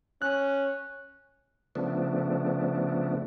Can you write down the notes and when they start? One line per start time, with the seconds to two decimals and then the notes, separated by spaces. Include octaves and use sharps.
0.22 C#4 F#6
1.75 C#3 F3 A3 B3 D4